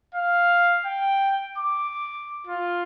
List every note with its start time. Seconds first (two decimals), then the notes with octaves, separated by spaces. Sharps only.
0.14 F5
0.85 G5
1.58 D6
2.47 F4